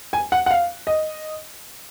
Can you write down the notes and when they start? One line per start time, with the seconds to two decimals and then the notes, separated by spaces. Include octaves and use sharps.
0.13 G#5
0.32 F#5
0.46 F#5
0.51 F5
0.87 D#5